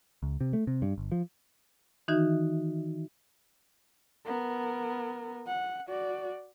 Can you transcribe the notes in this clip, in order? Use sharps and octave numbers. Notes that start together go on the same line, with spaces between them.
C#2
C3
A3
C3
G2
G1
F3
D#3 E3 D#4 F#4 E5
B3 A#4
F#5
F#4 D5